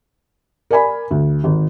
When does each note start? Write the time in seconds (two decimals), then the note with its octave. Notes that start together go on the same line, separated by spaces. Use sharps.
0.71 A#4 D5 G#5 B5
1.11 D2
1.44 G#1